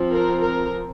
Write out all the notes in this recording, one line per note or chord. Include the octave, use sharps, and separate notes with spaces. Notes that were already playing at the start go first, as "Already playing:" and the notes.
Already playing: F3 C4
A#4
A#4